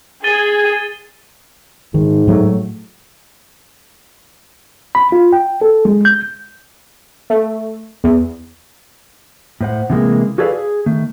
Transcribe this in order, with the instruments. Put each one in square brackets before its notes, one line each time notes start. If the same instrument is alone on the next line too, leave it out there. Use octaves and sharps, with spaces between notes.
[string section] G#4 [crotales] A6 D#7 G7
[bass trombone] G#2 [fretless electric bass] D#3
[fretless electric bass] A2 F#3 A3
[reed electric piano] B5
F4
G5
A4
G#3
G6
[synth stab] A3
E2
[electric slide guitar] A2 C5 F#5
C3 E3 G#3 A#3
F#4 G#4 A4 B4 D5 F5
G#4
D#3 A3